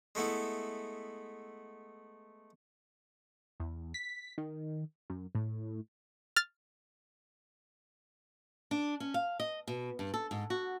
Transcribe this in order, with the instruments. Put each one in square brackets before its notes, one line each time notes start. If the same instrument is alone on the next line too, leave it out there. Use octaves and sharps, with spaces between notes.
[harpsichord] G#3 A3 B3 E4
[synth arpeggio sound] E2
B6
D#3
F#2
A2
[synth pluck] F6 A6
[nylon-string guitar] D4
C#4
F5
D#5
B2
G2
A4
G#2
F#4